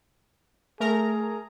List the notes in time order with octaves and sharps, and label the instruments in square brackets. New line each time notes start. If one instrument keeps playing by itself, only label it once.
[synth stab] A3 A#4 A#5 [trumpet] G#4